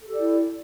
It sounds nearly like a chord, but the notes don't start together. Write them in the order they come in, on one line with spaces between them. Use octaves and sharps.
A4 G4 D5 E4